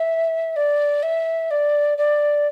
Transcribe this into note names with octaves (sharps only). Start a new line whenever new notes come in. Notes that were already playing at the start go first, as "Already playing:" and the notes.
Already playing: E5
D5
E5
D5
D5